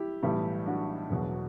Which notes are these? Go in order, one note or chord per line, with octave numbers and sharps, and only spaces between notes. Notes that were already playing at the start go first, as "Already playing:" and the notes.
Already playing: E4 G4
B1 A2 E3 G3
D4 F#4
E1 E2 B2 F#3